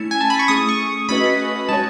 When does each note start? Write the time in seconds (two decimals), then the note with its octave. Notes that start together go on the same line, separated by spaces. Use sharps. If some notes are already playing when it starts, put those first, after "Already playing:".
Already playing: A3 C#4 E4
0.11 G#5
0.21 A5
0.30 B5
0.39 C#6
0.48 A3 C#4 G#4 D#6
0.69 C#6
1.09 A3 C#4 F#4 B4 D#5 B5
1.69 G#3 D#4 F#4 C#5 A5